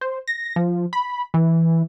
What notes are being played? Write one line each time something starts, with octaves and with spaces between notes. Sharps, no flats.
C5
A#6
F3
B5
E3